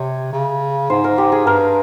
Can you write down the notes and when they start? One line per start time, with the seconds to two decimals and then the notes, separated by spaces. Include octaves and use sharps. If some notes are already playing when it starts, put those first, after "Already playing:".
Already playing: C3 C#5
0.33 C#3
0.90 G#2 C5
1.04 A#4
1.18 G4
1.32 G#4
1.46 G2 A#4